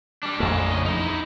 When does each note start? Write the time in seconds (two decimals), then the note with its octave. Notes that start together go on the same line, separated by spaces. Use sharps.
0.23 G3 D4
0.40 A#1 F2 G#3 A3 A4
0.70 C#3 D#5
0.85 E2 D#4 E4